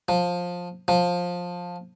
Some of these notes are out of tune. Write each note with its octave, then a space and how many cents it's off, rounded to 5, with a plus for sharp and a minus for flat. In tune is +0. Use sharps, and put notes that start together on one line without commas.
F3 +15
F3 +15